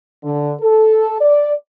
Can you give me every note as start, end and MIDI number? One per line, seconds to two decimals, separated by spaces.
0.23 0.52 50
0.59 1.18 69
1.20 1.51 74